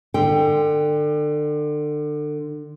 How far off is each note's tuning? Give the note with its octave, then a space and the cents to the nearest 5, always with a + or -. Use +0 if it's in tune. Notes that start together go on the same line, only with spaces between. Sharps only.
D3 +30 G5 +0